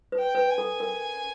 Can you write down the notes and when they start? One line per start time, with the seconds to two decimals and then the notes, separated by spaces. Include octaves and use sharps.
0.12 B4
0.19 G5
0.35 B4
0.50 G#5
0.58 A4
0.80 A#4